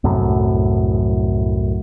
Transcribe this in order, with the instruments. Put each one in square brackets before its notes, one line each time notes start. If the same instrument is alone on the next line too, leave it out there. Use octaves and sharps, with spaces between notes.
[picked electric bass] C2 F#2 A2